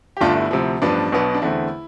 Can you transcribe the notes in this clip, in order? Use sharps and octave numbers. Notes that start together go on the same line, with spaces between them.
G4
G1 G2 D3 A3 D4 F4
E4
D2 C3 F3
A1 G2 F3 B3 D4
B1 B2 B3
D4
E2 D3 A3 C4 E4